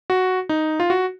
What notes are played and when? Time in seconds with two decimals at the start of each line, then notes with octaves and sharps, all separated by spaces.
0.10 F#4
0.49 D#4
0.80 F4
0.90 F#4